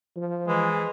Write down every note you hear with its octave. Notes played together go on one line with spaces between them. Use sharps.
F3
E3 G#3